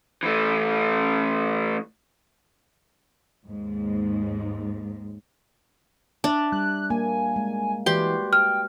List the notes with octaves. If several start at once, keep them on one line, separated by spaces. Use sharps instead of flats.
E3 A3
D#2 G#2
D4 D5 E5
G3 F#6
A#3 G#5
G#3
E3 F#4 G4 B4 D5 C6
G5 F6